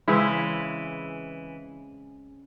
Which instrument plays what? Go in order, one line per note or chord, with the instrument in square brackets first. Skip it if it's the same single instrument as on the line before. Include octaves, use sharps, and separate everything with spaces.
[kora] C#3 G#3 C4 [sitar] E3 E4